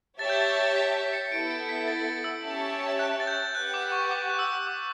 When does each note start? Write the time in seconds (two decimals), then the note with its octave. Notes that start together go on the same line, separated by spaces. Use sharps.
0.19 G4 C#5 E5 A5 A6
0.29 G6
0.41 A6
0.76 B6
0.94 B6
1.13 C#7
1.32 B3 E4 A4 D7
1.50 C#7
1.69 B6
1.88 A6
2.24 E6
2.43 C#4 G4 C#5 E5 A5
2.99 F#6
3.20 A6
3.27 G6
3.55 G4 B4 F#5 F#6
3.74 D6
3.92 C#6
4.11 D6
4.30 F#6
4.39 E6
4.67 D6